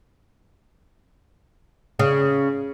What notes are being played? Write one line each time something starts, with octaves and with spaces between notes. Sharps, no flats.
C#3